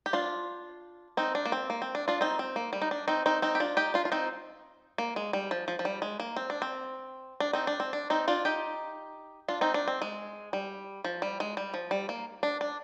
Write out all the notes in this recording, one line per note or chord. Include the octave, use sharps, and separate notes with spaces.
G4
D4 F4
C4 D#4
D4
A#3
C4
A#3
C4
D4
D4 F4
C4 D#4
C4
A#3
G3
D#4
D4
C4 D#4
C4 D#4
C4 D#4
G4
D4 F4
D#4 G4
D4 F4
F4
C4 D#4
A#3
G#3
G3
F3
F3
F3
G3
G#3
A#3
C4
D4
C4
D4
C4 D#4
D4
C4
D4
C4 D#4
D4 F4
D#4 G4
D4 F4
C4 D#4
D4
C4
G#3
G3
F3
G3
G#3
G3
F3
G3
A#3
D4
D4